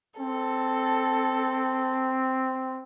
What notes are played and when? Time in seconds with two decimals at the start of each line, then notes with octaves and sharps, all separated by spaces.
0.20 C4 A4